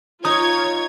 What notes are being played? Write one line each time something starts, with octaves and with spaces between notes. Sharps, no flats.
D#4 F4 C#5 D#6 G#6